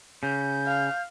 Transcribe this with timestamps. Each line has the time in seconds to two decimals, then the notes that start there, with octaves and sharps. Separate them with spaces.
0.23 C#3 G6
0.67 F5